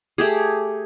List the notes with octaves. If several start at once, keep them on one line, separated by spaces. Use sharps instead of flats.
A3 G4 G#4